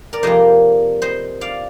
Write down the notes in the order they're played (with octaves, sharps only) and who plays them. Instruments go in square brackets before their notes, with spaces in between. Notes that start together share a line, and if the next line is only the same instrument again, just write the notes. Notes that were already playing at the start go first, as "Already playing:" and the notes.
[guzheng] A#4 D5
F2 C3 G3 A#3 C5 D#5
C5 D#5
D5 F5